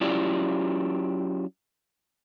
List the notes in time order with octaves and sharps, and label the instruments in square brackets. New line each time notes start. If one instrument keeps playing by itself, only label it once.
[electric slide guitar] F#3 C#4 E4 F4 G4 D5